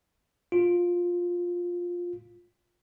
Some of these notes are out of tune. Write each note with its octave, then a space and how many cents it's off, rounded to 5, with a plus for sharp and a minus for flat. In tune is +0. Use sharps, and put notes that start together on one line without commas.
F4 +10